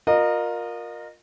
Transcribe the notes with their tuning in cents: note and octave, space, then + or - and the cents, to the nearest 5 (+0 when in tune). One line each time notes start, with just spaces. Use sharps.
F4 +25 A#4 +0 D#5 -25